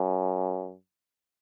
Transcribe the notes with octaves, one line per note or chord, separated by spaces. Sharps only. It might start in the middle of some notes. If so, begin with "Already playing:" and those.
Already playing: F#2